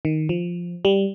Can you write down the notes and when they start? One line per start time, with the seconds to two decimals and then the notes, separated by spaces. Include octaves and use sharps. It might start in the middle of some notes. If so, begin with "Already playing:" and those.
0.05 D#3
0.29 F3
0.85 G3